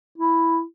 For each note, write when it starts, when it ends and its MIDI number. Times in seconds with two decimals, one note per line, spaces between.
0.18 0.62 64